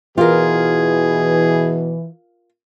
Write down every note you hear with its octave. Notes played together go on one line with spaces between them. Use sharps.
B2 E3 F4 G#4 A#4